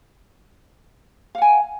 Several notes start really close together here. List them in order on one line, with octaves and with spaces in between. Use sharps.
F5 F#5 G#5